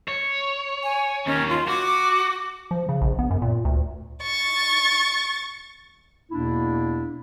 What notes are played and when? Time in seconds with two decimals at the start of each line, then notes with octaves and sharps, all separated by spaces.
0.08 C#5
0.83 G#5
1.26 D#2 C#4
1.50 F4
1.67 F#4 D6
2.71 F3
2.89 C#3
3.01 A#1
3.19 B3
3.30 F#2
3.42 A#2
3.65 D2
4.23 C#6 A6
6.31 E2 B2 A#3 D4 E4